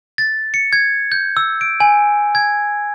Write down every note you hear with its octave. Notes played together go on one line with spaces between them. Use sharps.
A6
C#7
G#6
G6
E6
D7
G#5
G#6